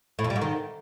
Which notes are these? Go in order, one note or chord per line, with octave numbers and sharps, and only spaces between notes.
A2
F2
G3
G#2
D#3